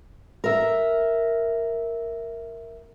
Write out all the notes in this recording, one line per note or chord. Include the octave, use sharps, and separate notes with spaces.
A#4 E5